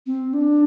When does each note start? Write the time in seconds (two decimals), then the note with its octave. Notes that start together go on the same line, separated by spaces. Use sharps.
0.06 C4
0.33 D4